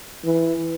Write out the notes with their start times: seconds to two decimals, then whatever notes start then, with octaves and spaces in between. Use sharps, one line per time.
0.25 E3